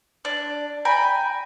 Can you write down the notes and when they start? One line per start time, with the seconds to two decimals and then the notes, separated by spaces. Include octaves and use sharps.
0.25 D4
0.85 G5 G#5 A#5 B5